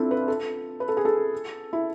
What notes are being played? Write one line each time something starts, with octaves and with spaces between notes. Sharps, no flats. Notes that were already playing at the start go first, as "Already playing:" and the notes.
Already playing: C4 D4 E4 F4 A4
B4
A4
B4
A4
G#4
A4
E4